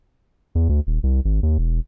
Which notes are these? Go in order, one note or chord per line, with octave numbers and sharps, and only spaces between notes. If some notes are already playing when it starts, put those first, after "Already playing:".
E2
D2
D#1
C2
G#1
D#2
E1